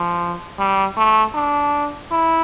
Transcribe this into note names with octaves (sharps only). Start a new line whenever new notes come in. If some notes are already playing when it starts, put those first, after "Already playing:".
Already playing: F3
G3
A3
D4
E4